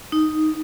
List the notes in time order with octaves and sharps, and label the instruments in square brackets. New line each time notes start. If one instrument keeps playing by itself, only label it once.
[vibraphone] D#4